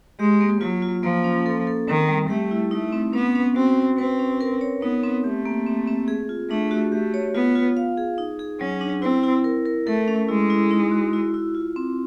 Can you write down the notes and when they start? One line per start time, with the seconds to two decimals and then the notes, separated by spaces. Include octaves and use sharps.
0.19 G#3 G4
0.41 A#3
0.61 F#3 F4
0.82 F4
1.03 F3 A#3
1.24 C#4
1.46 A4
1.67 A4
1.88 D#3 C4
2.09 G3
2.29 A3 G4
2.51 E4
2.71 A3 D#4
2.92 C4
3.13 B3 C#4
3.35 C#4
3.55 C4 F#4
3.77 C#4
3.97 C4 B4
4.19 C#4
4.41 A#4
4.61 C#5
4.82 B3 D#4
5.04 C4
5.24 A3 G4
5.45 A#3
5.66 C4
5.87 C4
6.08 G#4
6.29 F4
6.50 A3 D4
6.71 F#4
6.92 A3 G4
7.14 C#5
7.34 B3 F4
7.56 F4
7.77 F5
7.98 G#4
8.18 D#4
8.39 G#4
8.60 F#3 C#4
8.81 D4
9.02 C4 E4
9.23 E4
9.44 A#4
9.65 A#4
9.87 A3 A4
10.08 C#4
10.28 G#3 E4
10.50 E4
10.71 D#4
10.92 F#4
11.13 E4
11.34 E4
11.55 F4
11.76 C4